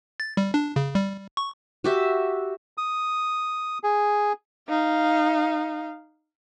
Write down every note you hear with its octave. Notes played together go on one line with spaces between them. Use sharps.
A6
G3
D4
C#3
G3
C#6
F#4 G4 E5
D#6
G#4
D#4 F5